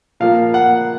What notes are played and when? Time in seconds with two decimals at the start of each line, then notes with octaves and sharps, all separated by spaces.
0.20 A#2 F3 A#3 F5
0.54 F#5